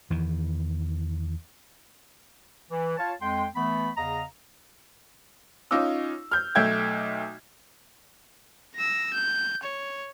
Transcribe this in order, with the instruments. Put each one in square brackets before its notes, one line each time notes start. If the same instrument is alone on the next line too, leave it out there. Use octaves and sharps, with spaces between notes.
[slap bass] E2 D#3 E3
[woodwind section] E3
F4 C#5 F5 A5
F2 G#3 G5 C6
E3 A3 B3 B5
E2 C#3 D#5 F5 A#5
[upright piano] C#4 D#4 F4 D6 E6
F6 G6
B1 A3 E5 G5 G#6
[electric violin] E6 A#6
G6
C#5